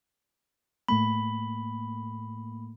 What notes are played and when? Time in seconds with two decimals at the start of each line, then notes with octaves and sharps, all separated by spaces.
0.88 A2 A3 A#3 B5